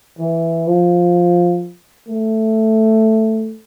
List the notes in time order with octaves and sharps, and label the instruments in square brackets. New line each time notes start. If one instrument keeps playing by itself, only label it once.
[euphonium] E3
F3
A3